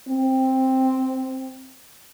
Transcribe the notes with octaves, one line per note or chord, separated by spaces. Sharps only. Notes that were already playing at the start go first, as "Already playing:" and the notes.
C4